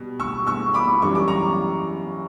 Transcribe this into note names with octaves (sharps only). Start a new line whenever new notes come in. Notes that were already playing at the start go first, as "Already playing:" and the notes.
Already playing: B2 G3
C#6 E6
C#6 E6
B5 D6
F#2 E3 G3 C#6
D6
A#5 C#6